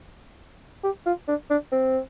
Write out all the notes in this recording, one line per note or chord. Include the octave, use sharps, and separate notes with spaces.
G4
F4
D4
D4
C4